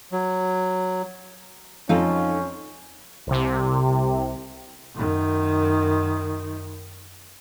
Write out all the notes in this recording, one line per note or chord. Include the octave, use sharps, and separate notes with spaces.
F#3
F2 C#4 D#4 F4 A4
C2 C3
F#2 D#3